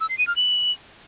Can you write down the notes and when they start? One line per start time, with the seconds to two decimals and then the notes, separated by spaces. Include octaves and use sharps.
0.01 E6
0.09 C7
0.18 D#7
0.27 F6
0.36 F#7